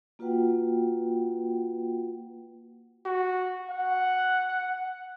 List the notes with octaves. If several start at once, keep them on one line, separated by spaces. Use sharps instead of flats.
A#3 F4 F#4 B4 F#5 G5
F#4
F#5